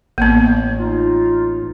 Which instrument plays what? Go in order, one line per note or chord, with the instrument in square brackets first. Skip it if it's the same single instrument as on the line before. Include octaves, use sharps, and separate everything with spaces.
[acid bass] A1 [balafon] A#3 B3
[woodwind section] D#4 F4